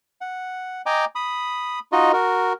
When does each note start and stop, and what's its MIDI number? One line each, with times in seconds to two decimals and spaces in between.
0.21 0.82 78
0.86 1.05 75
0.86 1.05 79
0.86 1.05 80
0.86 1.05 82
0.86 1.05 86
1.15 1.79 83
1.15 1.79 87
1.92 2.12 63
1.92 2.12 65
1.92 2.12 66
1.92 2.12 75
2.13 2.53 66
2.13 2.53 70